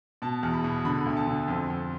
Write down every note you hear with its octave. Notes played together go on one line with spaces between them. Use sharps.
B2 A5
E2
B5
B2
D3 B5
D2
A5
D3
F2
F2